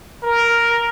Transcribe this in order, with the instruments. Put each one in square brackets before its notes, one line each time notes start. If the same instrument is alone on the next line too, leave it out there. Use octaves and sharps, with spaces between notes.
[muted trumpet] A#4